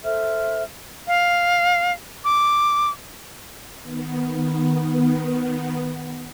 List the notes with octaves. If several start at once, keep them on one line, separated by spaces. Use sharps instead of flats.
A4 C5 E5 F6
F5
D6
D#3 B3